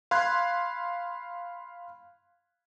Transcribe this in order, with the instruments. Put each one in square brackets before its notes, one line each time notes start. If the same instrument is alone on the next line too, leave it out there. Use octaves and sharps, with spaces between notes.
[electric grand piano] F5 B5 C6 F#6 G#6